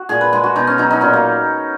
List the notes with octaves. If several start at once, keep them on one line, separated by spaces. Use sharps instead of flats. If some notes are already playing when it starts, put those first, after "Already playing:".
Already playing: F#4
A#2 G#4
B4
G#3 G#4
F#4
B2 D#4
C#4
F#3 D#4
D#4
A#2 C#4
A#3